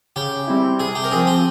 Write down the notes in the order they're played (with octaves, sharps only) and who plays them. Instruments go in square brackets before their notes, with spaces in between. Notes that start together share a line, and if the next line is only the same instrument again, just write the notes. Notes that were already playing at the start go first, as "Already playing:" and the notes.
[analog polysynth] C#3 [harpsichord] G4
[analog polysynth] G3 C4 E4
[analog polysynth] C3 [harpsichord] G#4
[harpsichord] G4
A#4
[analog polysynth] F3 C4 [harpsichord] G#4
[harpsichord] G4